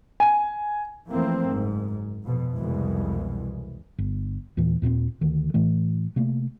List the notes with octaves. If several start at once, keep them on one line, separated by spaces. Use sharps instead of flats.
G#5
E3 F3 A3 A#3 C4
F#1 G#2
F2 B2
C2 F2 B2 E3 G#3
G1
D#2 A#2 E3
D#2 A#2 A3 C4
D2 D#3
A2 E3 A3
C3 A3 A#3